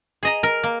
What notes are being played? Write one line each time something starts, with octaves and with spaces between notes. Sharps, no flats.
G#4 D#5 A#5
A#4
A#3